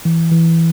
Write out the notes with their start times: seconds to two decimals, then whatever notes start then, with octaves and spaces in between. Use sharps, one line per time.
0.05 E3
0.32 E3